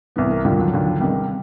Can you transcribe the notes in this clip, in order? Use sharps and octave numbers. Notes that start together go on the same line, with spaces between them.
C2 C3 E3 B3
A#3
D#2 D3 F3 G3
F#3
D#2 D3 F3
C#2 C3 D#3 G3